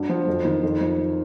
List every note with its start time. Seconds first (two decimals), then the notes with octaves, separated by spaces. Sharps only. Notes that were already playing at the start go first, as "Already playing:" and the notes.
Already playing: G2 F#3
0.09 F3
0.28 F2
0.45 D#3
0.63 F2
0.81 F3